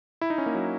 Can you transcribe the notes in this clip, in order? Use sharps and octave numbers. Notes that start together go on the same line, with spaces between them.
E4
D#4
C#4
A#3
F#3